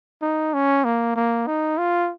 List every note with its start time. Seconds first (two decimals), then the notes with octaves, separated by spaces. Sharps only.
0.22 D#4
0.54 C#4
0.85 A#3
1.16 A#3
1.47 D#4
1.78 F4